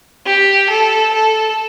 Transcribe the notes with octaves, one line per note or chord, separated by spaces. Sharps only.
G4
A4
A4